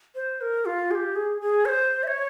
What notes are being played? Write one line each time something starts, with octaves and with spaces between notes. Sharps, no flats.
C5
A#4
F4
G#4
G4
G#4
G#4
C#5
C5
E5
C#5